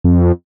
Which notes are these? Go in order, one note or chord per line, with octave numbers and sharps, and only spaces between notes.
F2